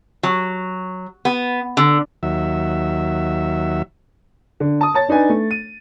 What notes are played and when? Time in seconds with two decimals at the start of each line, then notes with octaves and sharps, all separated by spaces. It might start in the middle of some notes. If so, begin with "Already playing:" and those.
0.23 F#3
1.25 B3
1.77 D3
2.23 D#2 F#3 E5
4.60 D3
4.81 A5 D#6
4.94 C#5 A5 A6
5.09 D4 D#4 B4 G#5
5.29 A3
5.51 D#7